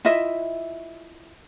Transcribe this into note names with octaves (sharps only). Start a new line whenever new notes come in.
E4 F4 D#5 E5